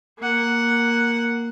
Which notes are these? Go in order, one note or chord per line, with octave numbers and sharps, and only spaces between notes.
A#3 F#5